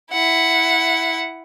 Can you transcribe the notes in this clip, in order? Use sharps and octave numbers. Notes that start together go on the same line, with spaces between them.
E4 F#5